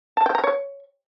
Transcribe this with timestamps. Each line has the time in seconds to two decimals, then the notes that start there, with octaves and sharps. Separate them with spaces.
0.17 A5
0.26 G5
0.35 A#5
0.44 C#5